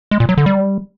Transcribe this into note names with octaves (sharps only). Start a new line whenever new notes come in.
G#3
A#2
F#3
D3
G3